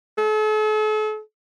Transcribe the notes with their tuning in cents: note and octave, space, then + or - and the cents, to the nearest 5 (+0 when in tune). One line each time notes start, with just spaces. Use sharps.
A4 -45